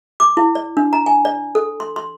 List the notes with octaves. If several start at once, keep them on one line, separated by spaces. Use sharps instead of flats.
D6
E4
D5
D4
A#5
G#5
D5
A4
C6
C6